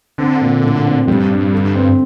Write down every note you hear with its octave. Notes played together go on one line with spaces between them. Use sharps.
D3 C4
A#2
A2
C4
G2 G3
D4
D3
C4